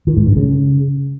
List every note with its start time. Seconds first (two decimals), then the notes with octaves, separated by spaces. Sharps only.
0.07 D#3
0.17 G#2
0.26 G2
0.36 C#3